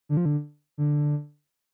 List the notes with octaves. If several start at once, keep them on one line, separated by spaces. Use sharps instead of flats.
D3
F3
D3
D3